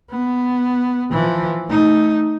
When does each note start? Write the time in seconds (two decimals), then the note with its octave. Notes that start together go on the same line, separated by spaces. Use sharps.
0.11 B3
1.11 E3 F3
1.70 A3 D#4